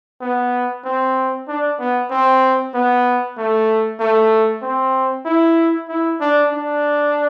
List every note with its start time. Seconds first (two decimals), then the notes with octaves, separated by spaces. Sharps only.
0.21 B3
0.85 C4
1.48 D4
1.80 B3
2.10 C4
2.75 B3
3.38 A3
4.00 A3
4.63 C4
5.26 E4
5.89 E4
6.21 D4
6.52 D4